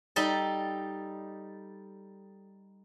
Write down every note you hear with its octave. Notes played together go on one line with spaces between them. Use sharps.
G3 D#4 A4